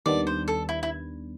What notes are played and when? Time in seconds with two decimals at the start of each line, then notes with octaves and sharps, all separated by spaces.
0.06 D#2 D#3 G3 B3 D4 D5
0.27 C5
0.48 A4
0.69 E4
0.83 E4